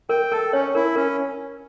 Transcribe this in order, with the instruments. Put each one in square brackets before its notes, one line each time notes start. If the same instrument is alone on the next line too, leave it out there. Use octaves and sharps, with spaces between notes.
[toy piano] A#4 [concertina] G5
[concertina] A4 [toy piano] A#4
[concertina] C#4 [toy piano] C#5
[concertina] E4 [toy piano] A#4
[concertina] C#4 [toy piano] A#4